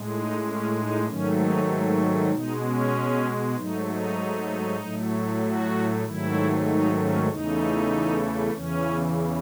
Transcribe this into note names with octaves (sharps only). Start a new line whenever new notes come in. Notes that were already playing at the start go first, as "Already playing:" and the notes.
Already playing: A2 G#3
D#4
C#4
D#4
G#2 D#3 F#3 A3 C#4
D#4
B2 G#3 D#4
C#4
G#2 F#3 A3 D#4
D#4
A2 F#3 A3
F#4
G#2 D#3 F#3 A3 E4
D#4
C#4
E2 C#3 E3 A3 D#4
E2 C#3 E3 C#4